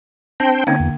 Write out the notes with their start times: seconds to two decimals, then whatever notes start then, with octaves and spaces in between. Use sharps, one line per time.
0.40 C4 D4 C5 G5 A5
0.67 D3 A#3 C4 C#4 D#4 F5
0.80 E2